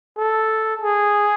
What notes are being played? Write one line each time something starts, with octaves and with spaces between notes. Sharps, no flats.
A4
G#4